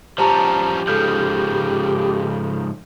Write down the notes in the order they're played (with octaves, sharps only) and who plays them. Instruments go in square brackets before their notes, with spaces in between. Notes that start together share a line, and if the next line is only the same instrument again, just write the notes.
[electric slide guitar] F3 G3 C#4 [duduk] G4 [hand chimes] C5 A5 A#5
[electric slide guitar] G#2 C#3 F3 [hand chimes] A4 F6 G6